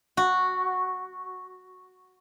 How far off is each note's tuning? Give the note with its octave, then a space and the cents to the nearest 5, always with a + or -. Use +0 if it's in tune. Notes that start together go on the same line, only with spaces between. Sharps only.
F#4 -5